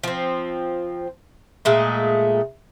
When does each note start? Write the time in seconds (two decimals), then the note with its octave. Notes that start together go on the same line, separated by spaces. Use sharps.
0.03 F3 C4
1.65 A#2 G#3 A3